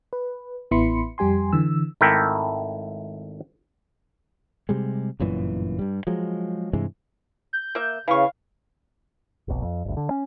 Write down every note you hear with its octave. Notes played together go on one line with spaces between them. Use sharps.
B4
A1 B3 E4 B5 C6 C#7
F2 G3 G4 G#5 C6
D3 E3 E6
G#1 A3 E4 A#4 E5 G5
C3 G3 G#3
G1 F#2 A#2 E3
G2 G3
F3 F#3 G#3
G2 C3 E3 G#3
G6
A#3 E5
C#3 E3 F5 C#6
F1 B1
F2
G1 D2
D3
C#4